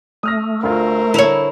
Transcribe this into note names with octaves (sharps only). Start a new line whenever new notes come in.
A3 D#6 F6 A#6
D2 F4 A#4 C5
D3 E4 C#5 A#5 F7